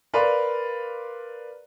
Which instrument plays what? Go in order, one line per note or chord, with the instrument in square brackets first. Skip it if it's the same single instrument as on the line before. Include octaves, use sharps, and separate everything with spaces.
[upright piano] A#4 B4 D5 F5 C6